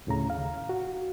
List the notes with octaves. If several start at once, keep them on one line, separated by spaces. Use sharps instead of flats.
D2 A2 C#3 A#5
D#2 F5
F#4